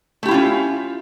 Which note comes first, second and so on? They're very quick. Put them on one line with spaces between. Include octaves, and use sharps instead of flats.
A3 G4 E4 F4 C#4